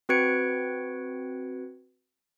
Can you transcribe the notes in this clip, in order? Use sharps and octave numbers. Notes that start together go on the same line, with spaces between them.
C4 F#4 B4 G#6 C#7 D7